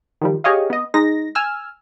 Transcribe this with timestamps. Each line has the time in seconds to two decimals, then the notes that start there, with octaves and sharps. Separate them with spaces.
0.21 D#3 F3 G3
0.44 G4 G#4 C#5 D#5 F5
0.70 B3 D#5
0.94 G#3 D#4 A#6
1.35 G#5 E6 F6